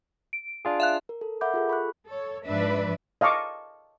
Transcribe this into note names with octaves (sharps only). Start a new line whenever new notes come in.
D7
D4 F4 G#4
E5 F5 F#6
A#4
A4
A#4 E5 F#5 B5 D6 G6
F4 G#4 A4
B5 C#6 F#6
A4 C#5
G#2 F3 D4 B4 D5 E5
D#5 F5 A5 C#6 D6